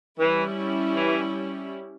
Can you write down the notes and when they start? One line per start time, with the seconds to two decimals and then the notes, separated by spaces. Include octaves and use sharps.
0.18 E3 G3 C#4 E4
0.95 E3